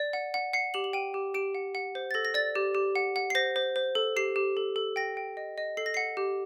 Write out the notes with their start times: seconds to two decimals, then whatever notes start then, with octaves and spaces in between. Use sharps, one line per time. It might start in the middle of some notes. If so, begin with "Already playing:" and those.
Already playing: D5
0.13 F#5
0.34 F#5
0.53 F#5 C7
0.74 G4 F#7
0.84 F#7
0.93 G5 D#7
1.14 G4
1.34 G4 D7
1.55 F#5
1.75 F#5
1.95 C5
2.11 A6
2.14 A4 A#6
2.25 A#6
2.34 D5 A6
2.55 G4
2.75 G4
2.96 F#5
3.16 F#5
3.30 C7
3.35 C5 A#6
3.56 C5
3.76 C5
3.95 A4
4.16 G4 C7
4.36 G4
4.57 A4
4.76 A4
4.96 G5 A#6
5.17 G5
5.37 D#5
5.58 D#5
5.77 A4 C7
5.86 A#6
5.94 F#5 C7
6.17 G4